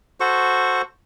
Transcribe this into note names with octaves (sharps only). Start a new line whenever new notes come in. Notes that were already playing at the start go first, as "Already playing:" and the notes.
F#4 A4 C5 C#6